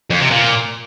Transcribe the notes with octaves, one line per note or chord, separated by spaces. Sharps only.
F2
C3
A#2